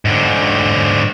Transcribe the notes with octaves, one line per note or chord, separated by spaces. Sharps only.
G#2 D3